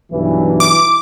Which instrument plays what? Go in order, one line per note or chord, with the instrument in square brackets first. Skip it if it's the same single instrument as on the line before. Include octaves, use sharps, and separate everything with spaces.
[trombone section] B1 G2 E3
[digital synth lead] D6